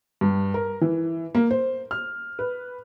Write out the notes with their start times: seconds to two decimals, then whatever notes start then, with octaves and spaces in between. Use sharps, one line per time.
0.21 G2
0.54 A#4
0.81 E3
1.35 A#3
1.51 C5
1.91 F6
2.39 B4